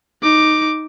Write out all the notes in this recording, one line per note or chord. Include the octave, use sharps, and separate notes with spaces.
D#4 D6